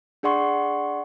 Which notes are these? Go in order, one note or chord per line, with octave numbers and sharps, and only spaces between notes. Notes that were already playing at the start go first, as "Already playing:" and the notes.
D4 G#4 D5 F#5 C6 C#6